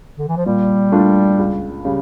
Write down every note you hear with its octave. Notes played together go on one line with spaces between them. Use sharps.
D3
E3
F3
A#2 G3
A3 D4 F4
C#2
C#3 G3